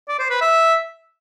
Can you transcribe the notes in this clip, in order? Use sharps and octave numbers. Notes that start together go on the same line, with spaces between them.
D5
C5
B4
E5